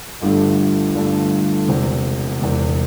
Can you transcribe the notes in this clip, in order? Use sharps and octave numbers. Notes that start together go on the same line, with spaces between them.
G1 G2 D3 A3 G4
G1 G2 D3 A3
E1 E2 C3
E1 E2 C3